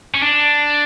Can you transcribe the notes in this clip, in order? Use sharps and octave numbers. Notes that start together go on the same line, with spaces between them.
C#4
D4